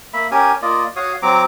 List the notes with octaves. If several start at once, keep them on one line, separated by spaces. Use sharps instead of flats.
A#3 E5 B5
C#4 G4 A#4 G#5
A#3 F4 D5 D#5
F#4 C#5 F5 D#6
F#3 C4 A#5 D6